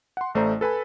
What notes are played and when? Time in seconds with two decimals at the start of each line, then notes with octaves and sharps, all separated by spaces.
0.17 F#5 C6
0.35 A1 A3 C5 D5 A#5
0.61 A4 B4 G#5 B5